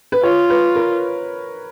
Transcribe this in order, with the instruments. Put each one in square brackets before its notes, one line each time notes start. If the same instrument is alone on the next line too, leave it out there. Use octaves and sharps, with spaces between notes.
[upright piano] B4
[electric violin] F4 [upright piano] C#5
[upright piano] B4
A#4